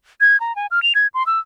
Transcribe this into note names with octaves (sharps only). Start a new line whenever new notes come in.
G#6
A#5
G#5
F6
F7
G#6
C6
E6